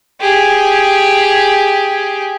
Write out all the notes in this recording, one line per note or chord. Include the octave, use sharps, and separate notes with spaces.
G4 G#4